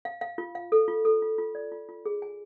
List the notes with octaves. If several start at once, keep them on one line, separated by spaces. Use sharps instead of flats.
F5
F5
F4
F5
A4
F4
A4
F4
F4
D5
F4
F4
G#4
G#5